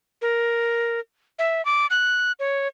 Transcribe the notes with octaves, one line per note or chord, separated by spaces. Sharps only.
A#4
E5
D6
F#6
C#5